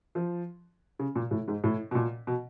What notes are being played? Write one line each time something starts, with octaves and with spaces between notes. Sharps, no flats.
F3
C#3
A#2
A2
G#2
A2
B2
A#2
B2